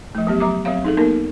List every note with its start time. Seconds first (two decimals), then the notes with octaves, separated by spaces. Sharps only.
0.15 F3 A3
0.27 F#3 B3 G4
0.40 F#3 A#5 D6
0.65 F#3 C4 C#5 F5
0.85 D#4 G#4 A4
0.97 A#3 B3 D#4 A#4